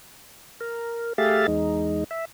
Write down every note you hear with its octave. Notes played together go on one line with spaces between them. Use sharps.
A#4
A3 G4 G#4 E5 F5 A6
E2 G#3 D#4
E5